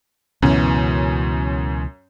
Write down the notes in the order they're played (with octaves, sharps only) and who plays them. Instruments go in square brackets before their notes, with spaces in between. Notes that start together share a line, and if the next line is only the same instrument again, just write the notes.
[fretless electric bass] C#2 B2 E3 [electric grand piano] F#2 C#4